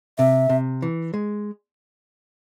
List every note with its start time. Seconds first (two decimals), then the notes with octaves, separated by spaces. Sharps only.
0.18 C3 E5
0.49 C3
0.82 E3
1.14 G#3